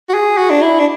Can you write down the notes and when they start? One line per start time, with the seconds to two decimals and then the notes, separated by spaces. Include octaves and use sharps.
0.09 F#4
0.14 G#4
0.38 F#4
0.50 D4
0.62 E4
0.79 D4